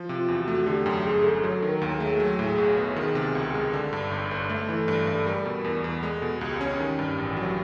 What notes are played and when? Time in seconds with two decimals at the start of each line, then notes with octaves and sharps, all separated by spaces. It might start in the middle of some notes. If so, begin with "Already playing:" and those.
Already playing: F3
0.09 C3
0.15 F4
0.28 E2
0.40 F#4
0.48 A3
0.66 D3 G4
0.86 F#2 G4
1.05 G1 G#4
1.24 G1 A4
1.43 F#3 A4
1.62 D#3
1.69 A#4
1.82 D#2
1.95 G#4
2.00 A3
2.20 F#3
2.39 A2
2.58 B1
2.77 B3
2.96 D#3
3.15 C3
3.35 C#2
3.54 G#3
3.73 D3
3.93 G2
4.11 G1
4.31 G1
4.49 A3 A4
4.69 E3
4.88 G2
5.07 G2
5.14 A4
5.26 G3 A#4
5.46 B2
5.64 E2 A#4
5.84 E2
6.03 G#3 A4
6.22 B2
6.41 C#2 G4
6.61 C#4
6.80 D#3
6.99 G2
7.18 A1
7.37 F#3